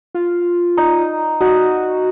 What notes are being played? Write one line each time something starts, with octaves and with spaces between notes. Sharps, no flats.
F4
D#4
D#4 F#4